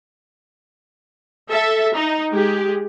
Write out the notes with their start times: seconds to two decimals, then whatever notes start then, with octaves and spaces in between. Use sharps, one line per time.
1.50 A4 E5
1.95 D#4
2.31 G#3 G4 G#4